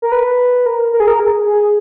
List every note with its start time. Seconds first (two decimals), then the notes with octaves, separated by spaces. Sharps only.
0.02 A#4
0.12 B4
0.66 A#4
0.92 A#4
1.00 G#4
1.08 A#4
1.20 G#4
1.46 G#4